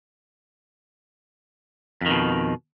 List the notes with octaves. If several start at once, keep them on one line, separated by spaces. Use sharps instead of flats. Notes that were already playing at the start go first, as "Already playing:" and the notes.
F2 B2 D#3